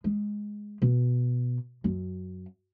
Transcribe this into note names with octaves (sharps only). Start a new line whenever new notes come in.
G#3
B2
F#2